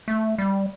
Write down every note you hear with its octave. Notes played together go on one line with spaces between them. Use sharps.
A3
G3